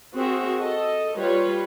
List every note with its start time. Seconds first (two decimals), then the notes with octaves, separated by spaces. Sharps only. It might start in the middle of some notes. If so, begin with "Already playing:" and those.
0.16 C4 F#4 G#4 A#4 E5
0.60 A4 D#5
1.18 G3 F4 B4 C#5